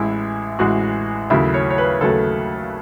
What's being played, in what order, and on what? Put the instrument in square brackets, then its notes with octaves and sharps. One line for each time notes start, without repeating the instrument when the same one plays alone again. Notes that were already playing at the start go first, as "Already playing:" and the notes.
Already playing: [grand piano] A1 A2 G#3 E4
A1 A2 G#3 F#4
D#2 C#3 F#3 A3 E4
C#5
C#5
B4
D#2 C#3 F#3 A3 A4